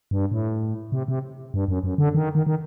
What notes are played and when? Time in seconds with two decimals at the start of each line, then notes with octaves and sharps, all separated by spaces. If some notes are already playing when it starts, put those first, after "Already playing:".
0.11 G2
0.32 A2
0.92 C3
1.08 C3
1.54 G2
1.68 F#2
1.84 F#2
1.98 D3
2.15 D#3
2.35 D#3
2.47 D#3